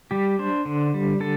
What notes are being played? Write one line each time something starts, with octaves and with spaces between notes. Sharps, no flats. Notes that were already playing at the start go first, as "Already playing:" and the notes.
G3 G4
D4 C5
D3
G3
D3 A4